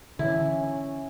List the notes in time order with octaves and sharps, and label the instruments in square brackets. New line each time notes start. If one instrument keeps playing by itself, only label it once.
[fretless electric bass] D3 E3 [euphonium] C#4 [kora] E4